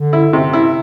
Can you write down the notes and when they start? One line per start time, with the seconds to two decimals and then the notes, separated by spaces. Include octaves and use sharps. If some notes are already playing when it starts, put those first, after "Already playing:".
Already playing: D3
0.13 E4
0.33 C3
0.53 E4